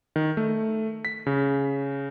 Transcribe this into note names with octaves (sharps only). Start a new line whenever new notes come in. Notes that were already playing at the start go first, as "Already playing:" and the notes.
D#3
A3
B6
C#3